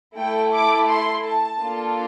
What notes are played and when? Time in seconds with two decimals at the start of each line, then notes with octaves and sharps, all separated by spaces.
0.16 A3 E4 A4 G5
0.52 D6
0.88 C6
1.23 A5
1.59 A#3 D4 F4 A4